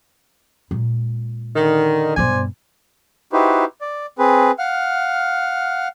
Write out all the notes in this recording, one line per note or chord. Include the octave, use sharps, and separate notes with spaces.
A#2 G#3
D3 D#3
G2 B2 C5 D5 G#5
D#4 E4 F#4 G4 B4 C5
D5
C4 G#4 B4
F5 F#5 F6